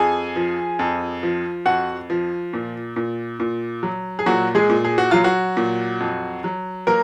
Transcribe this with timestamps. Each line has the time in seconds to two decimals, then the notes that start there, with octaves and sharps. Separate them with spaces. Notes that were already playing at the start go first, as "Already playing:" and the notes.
Already playing: F2 G#4 G#5
0.36 F3
0.79 F2
1.23 F3
1.66 F2 F#4 F#5
2.10 F3
2.53 A#2
2.96 A#2
3.40 A#2
3.83 F#3
4.19 G#4
4.26 A#2 F#3 F#4
4.55 G#3 G#4
4.69 A#2
4.84 G#4
4.98 F#4
5.11 F#3 F4
5.24 F#3 F#4
5.57 A#2
6.00 F2
6.44 F#3
6.87 F#3 A#3 A#4